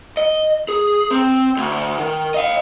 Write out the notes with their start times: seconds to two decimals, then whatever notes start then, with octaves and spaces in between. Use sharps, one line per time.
0.17 D#5
0.68 G#4
1.11 C4
1.57 D2
2.00 D#3
2.34 D#5 F5